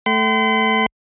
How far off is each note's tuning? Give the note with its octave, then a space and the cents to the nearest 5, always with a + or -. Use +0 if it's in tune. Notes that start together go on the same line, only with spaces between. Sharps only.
A3 +0 G5 -40 C6 -40